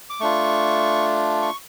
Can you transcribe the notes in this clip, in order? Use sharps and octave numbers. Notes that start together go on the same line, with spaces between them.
D6
A3 D4 F4 C#6
C#6